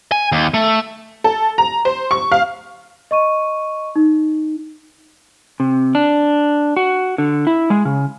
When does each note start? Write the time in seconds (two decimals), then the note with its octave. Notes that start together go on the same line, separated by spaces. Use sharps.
0.12 G#5
0.32 D#2
0.54 A3
1.24 A4
1.58 A#5
1.85 C5
2.11 C#6
2.32 F5
3.11 D#5 C#6 D#7
3.96 D#4
5.60 C3
5.95 D4
6.76 F#4
7.18 D3
7.47 E4
7.70 G#3
7.85 C#3